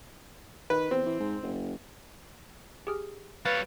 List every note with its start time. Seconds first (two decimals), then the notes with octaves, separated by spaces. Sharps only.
0.70 D#3 B4
0.91 E2 C4
1.06 E3
1.20 G#2
1.43 F#1
2.87 G4 G#4 F6
3.45 G3 B4 C#5 F5 F#6 A6 C7